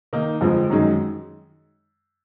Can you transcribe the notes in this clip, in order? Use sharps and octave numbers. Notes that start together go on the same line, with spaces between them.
D#3 A#3 D#4
F2 D3 F3 G#3
F#2 D#3 G#3